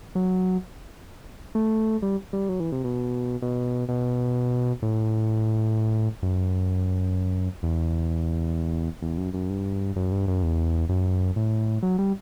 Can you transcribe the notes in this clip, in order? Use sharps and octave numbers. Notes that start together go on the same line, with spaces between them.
F#3
A3
G3
G3
F#3
E3
C3
B2
B2
B2
A2
F#2
E2
E2
F#2
F#2
G2
F#2
G2
F#2
E2
F#2
A2
F#3
G3